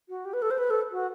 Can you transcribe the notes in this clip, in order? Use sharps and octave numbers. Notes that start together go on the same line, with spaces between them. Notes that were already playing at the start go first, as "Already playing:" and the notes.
F#4
G4
B4
A4
C5
B4
A4
F#4